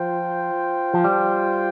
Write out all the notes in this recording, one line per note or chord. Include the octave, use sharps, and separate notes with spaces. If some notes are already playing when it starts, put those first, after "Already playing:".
Already playing: F3 F4 C5 G5
F3
G3